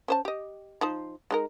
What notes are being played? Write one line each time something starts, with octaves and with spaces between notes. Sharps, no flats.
C#4 C5 A5
G4 D#5
F3 D#4 C5
G#3 D#4 A#4